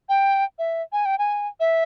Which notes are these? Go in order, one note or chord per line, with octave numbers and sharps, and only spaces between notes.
G5
E5
G#5
G5
G#5
E5